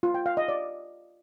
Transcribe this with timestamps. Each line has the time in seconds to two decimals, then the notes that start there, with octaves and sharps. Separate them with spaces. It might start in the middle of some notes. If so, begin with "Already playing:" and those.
0.03 F4
0.14 G5
0.26 F5
0.37 D#5
0.48 D5